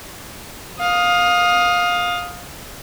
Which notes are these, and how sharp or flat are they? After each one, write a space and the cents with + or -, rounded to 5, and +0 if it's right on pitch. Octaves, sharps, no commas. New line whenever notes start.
F5 +20 D#6 +0